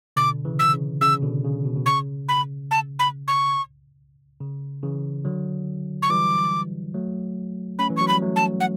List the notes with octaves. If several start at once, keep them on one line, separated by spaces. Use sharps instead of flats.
B2 D3 D6
C#3 E3
E6
C#3
C#3 E6
B2 D3
C#3
B2
B2
C#3 C#6
B5
A5
B5
C#6
C#3
C#3 E3
D3 F#3
C#6
E3 G3 D6
F#3 A3
A3 C#4 B5
E3
F#3 C#6
G3 B5
F#3 A3
A5
F#5